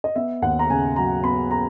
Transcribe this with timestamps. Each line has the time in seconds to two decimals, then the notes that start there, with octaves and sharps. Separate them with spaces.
0.04 D#5
0.16 B3 E5
0.42 D#2 F#5
0.59 A#5
0.70 C#3 G#5
0.96 F#3 A#5
1.23 B3 B5
1.51 A#5